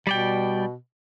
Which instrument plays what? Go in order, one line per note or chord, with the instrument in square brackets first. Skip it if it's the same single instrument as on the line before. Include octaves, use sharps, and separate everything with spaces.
[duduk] B2 [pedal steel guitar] G3 D5 G5